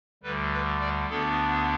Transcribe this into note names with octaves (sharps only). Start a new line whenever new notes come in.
D2 D3 G3 B4
B4
D5
D2 D3 B3 D4 A4